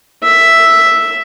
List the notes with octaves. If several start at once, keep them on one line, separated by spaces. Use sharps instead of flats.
E5